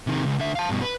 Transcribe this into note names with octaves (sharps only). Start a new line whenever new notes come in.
C3 D#3
C#2
D3 E5
F5 A5
G2 B2
B4